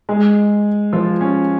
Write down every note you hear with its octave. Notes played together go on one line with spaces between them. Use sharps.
G#3 G#4
F3 F4
C#4